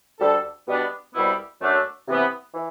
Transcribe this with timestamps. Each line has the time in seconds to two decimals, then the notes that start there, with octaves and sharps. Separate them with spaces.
0.19 D2 D3 G3 D4 A4
0.66 B2 G3 B3 D4
1.14 C2 B2 G3 B3 E4
1.60 F#2 F#3 A3 D4
2.07 C3 E3 B3
2.54 E3